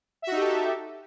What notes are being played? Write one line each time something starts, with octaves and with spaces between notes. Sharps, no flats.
D#4 F#4 G4 A4 E5